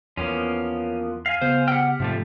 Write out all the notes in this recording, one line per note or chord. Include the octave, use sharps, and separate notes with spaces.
E2 F3 A#3 B3 C#4
F5 G#5
C#3 B3 C5
G4 F#5 G5 F6
G#2 C3 F3 A3